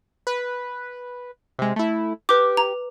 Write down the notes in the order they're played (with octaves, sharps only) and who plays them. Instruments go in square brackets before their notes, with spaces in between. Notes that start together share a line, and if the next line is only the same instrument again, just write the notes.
[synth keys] B4
C3 G#3
A3 E4
[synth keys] G4 [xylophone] B4 D6
[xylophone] A#5